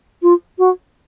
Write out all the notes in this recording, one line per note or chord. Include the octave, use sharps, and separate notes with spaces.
F4
F#4